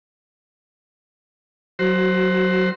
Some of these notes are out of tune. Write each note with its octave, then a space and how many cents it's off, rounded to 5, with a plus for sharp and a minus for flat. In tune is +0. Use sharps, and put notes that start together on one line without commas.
F#3 +0 F#4 +25 C5 +5